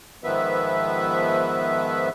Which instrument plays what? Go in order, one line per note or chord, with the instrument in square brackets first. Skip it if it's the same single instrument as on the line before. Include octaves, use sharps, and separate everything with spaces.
[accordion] G#2 D#3 F3 B3 B4 E5